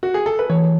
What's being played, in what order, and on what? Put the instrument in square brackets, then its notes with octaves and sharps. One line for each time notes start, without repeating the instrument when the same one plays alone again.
[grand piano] F#4
G#4
A4
B4
[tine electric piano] E3 [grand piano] C#5